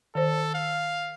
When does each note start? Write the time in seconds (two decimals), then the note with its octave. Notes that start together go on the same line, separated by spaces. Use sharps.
0.15 D#3 A4 C5
0.54 F5